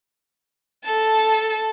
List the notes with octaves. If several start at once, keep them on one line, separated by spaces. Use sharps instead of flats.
A4 A5